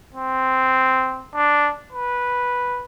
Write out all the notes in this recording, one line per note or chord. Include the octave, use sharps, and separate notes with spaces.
C4
D4
B4